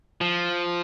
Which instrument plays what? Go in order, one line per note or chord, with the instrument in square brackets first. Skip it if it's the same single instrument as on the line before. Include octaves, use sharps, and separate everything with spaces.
[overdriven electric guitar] F3